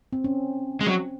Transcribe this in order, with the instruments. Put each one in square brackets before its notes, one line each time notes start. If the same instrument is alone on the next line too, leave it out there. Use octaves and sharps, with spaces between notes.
[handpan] C4
C#4
[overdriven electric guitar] G#3
F#3